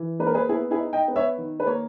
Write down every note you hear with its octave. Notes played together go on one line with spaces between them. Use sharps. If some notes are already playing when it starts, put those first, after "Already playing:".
Already playing: E3
A#3 B4
A#4
G#4 B4
B3 E4 G#4
E4 G#4
D#4
D#5 G5
B3
C#5 E5
D#3
B4
A#3 C#5